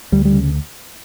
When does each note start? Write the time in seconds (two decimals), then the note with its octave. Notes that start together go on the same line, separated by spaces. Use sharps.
0.12 D2 G3
0.25 G3
0.32 C#3